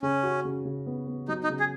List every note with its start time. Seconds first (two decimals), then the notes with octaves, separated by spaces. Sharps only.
0.02 C#3 C#4
0.23 F#4
0.45 C#3
0.65 C#3
0.86 B3
1.07 B3
1.28 F#3 D#4
1.44 D#4
1.50 C#3
1.60 G#4